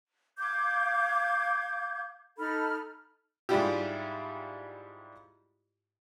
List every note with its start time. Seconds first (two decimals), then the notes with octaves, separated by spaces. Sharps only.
0.38 F5 D6 G6 G#6
2.38 D#4 A4 B5 F6
3.49 G#2 G3 D4 E4 F4 G4